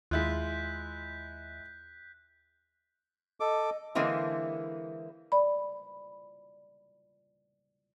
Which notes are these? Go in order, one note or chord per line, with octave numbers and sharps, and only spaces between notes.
D#2 G#3 E4 F4 F#6 G6 B6
A4 D#5 D6
D3 E3 G#3 A#3 C4 E4
D5 B5